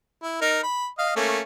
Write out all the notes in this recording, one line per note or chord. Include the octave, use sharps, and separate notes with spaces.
E4
D#4 A#4
B5
D#5 F5
A3 A#3 C#4